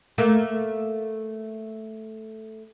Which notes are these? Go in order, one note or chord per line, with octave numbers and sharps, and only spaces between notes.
A3 A#3